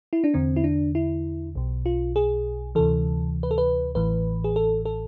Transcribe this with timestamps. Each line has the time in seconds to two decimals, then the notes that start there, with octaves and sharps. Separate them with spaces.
0.13 E4
0.24 D4
0.34 E2 D3 C4
0.56 E4
0.64 D4
0.95 E4
1.55 B1 B2
1.86 F4
2.16 G#4
2.75 D2 C3 E3 A4
3.43 B4
3.51 A4
3.58 B4
3.95 A1 A2 E3 B4
4.44 G#4
4.56 A4
4.85 A4